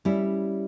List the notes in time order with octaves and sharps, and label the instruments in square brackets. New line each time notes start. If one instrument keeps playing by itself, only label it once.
[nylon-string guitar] G3 C#4 E4